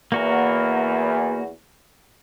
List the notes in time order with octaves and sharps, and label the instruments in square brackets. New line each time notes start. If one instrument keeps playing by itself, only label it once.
[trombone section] E2 [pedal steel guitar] A#3 F#4 A#4